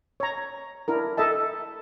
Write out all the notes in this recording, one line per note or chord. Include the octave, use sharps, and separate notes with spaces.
C#5 A#5
D4 E4 A#4
A4 D#5 E5 A5